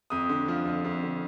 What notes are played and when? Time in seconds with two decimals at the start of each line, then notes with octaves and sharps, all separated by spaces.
0.10 F2 D#6
0.29 D3
0.48 F3
0.66 F2
0.84 F2
1.03 D3